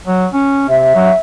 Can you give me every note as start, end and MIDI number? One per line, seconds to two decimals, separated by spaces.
0.07 0.26 54
0.33 0.69 61
0.69 0.92 48
0.69 1.21 76
0.95 1.11 54